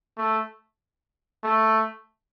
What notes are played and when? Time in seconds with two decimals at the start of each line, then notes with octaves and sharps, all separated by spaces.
0.18 A3
1.44 A3